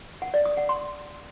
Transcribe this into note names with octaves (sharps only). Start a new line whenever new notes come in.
F#5
D5
D#6
F#5
C6